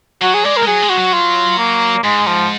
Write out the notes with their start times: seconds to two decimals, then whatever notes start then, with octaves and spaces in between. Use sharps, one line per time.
0.22 F#3 F#4
0.34 G#4
0.44 G#3 D5
0.57 A#4
0.63 G#3
0.67 F#3 G#4
0.82 G#3
0.89 F#4
0.98 F#3
1.13 F4
1.58 A#3
2.04 G#2 G#3
2.27 F3